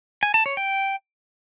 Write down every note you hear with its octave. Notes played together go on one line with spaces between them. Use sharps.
G#5
A5
C#5
G5